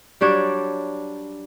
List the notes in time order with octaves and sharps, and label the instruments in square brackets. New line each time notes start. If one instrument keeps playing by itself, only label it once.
[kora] F#3 G3 D4 C#5